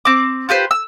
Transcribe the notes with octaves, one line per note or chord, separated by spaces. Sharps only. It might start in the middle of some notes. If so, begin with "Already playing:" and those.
C4 D6
F4 G4 B4 C5
E6